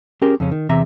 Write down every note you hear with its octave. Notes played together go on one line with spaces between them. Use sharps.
C#4 G4 G#4 A#4 C6
F2 C#3 C#4
D#3
E2 C3 E3 E5 A#5